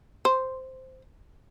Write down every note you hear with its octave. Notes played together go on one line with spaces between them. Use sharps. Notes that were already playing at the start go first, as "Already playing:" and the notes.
C5